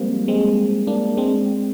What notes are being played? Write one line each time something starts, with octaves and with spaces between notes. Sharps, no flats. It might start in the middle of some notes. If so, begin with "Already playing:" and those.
Already playing: F3 G3 G#3 A#3 C4
G#3 C4
A#3 D4
G#3 C4